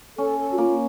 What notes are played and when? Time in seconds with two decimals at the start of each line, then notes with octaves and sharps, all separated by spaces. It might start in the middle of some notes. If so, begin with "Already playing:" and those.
0.18 C#4 A4
0.38 A4
0.51 F#4
0.58 A#3 F4